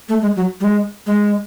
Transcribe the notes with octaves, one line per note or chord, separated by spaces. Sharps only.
A3
G#3
F#3
G3
G#3
G#3